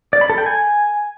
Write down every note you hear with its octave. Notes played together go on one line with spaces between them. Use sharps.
D5
B5
A4
G5
G#5